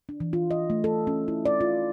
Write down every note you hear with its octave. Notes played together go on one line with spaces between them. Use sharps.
D4
E3
F4
D#5
A3
A4
C#4
E4
D5
F4